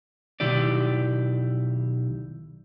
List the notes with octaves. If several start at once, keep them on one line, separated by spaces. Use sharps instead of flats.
B1 D#3 E4 G4 D5